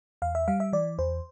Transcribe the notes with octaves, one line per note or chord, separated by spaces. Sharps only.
E2 F5
E5
G3 F5
E5
E3 D5
E2 C5